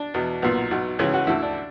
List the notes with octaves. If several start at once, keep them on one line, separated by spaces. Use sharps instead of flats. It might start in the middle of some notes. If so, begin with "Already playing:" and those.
Already playing: D4
E2 B2
B1 A#2 B3
B1 B2
C#2 C#3 E3 C#4
F#4
D2 D3 E4
D4